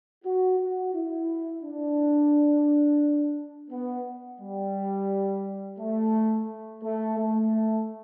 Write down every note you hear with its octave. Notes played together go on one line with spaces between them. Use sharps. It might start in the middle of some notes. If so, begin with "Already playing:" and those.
F#4
F#4
E4
D4
B3
G3
A3
A3
A3